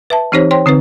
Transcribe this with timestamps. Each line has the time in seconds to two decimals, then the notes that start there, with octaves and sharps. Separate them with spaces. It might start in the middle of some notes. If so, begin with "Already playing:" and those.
0.10 B4 E5 A5
0.32 E3 C4 D#4 G4 C5 C#5
0.51 C5 C#5 G5 C6
0.66 D3 C4 D#4 B4